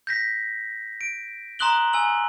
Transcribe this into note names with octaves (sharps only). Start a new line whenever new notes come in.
G6 A#6 B6
D7
A#5 C6 D#6 F#6 F#7 G7
G#5 E6 F#7